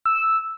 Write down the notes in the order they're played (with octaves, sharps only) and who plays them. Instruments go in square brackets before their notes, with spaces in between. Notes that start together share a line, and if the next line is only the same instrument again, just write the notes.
[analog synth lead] E6